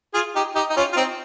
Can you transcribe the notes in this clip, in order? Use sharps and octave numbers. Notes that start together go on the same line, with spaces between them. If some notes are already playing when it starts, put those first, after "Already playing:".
F4 G#4
D#4 G4
D#4 G4
D#4
C#4 F4
F4
C4 D#4